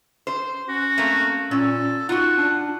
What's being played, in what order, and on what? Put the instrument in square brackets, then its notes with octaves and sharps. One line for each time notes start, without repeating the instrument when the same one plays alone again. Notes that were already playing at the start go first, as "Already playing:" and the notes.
[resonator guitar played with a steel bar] C5
[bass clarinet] C#4 [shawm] F#4
[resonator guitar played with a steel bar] A3 A#3 C4
[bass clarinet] A#2 [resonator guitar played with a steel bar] C#4 [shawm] A4
[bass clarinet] D#4 [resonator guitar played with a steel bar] F4 F#4 [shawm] F#5
[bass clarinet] D4